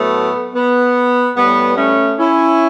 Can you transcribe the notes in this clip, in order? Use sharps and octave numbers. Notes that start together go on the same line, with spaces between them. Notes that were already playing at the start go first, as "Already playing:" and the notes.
Already playing: A2 F#3 A3 B3
B3
A2 G3 B3
A3 C#4
C#4 E4